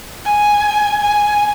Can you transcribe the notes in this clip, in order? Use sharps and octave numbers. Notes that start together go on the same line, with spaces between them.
G#5
G#5